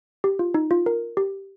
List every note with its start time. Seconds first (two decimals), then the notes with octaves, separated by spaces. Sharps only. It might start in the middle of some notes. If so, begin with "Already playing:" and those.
0.24 G4
0.39 F4
0.54 D#4
0.71 F4
0.86 A#4
1.17 G4